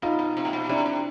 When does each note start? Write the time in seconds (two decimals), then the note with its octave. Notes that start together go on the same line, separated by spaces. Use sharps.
0.02 B2 D#4 F4
0.19 B2
0.37 C3
0.45 A#2
0.53 B2
0.69 C3 D4 E4
0.86 C3